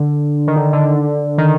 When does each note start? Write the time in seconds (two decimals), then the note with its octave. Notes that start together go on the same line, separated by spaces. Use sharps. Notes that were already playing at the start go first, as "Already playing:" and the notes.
Already playing: D3
0.47 D#3
0.56 D3
0.73 D3
1.38 D#3